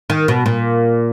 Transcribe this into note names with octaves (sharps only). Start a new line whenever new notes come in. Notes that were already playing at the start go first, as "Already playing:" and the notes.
D#3
B2
A#2